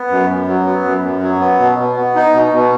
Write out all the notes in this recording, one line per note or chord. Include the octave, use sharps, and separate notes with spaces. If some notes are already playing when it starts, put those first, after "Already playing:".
Already playing: B3
F#2
F#2
F#3
B3
F#2
F#2
F#3
B3
B2
B2
B3
D#4
B2
B2